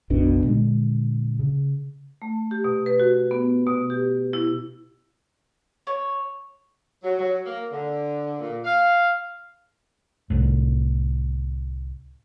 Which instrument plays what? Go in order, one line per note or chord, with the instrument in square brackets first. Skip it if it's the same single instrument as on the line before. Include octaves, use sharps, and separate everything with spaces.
[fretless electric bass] F#1 B1 B2 D4
A#2 D3 G#3
C#3
[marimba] A3
G4
B2
B4
F#4
B3
B2
G4
E4
[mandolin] C#5
[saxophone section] F#3
F#3
A#3
D3
A#2
F5
[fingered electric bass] C2 A2